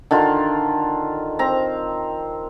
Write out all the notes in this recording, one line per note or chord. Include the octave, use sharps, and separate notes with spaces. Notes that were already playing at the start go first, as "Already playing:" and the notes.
D3 D#3 F4
C4 A#5